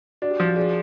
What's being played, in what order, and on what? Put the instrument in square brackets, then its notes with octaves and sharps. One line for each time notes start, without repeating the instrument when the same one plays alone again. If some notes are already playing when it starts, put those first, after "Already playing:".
[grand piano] D4 [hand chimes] F#4
[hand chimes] G4
[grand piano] F3 [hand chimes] F#4
[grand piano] D4 [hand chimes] G#4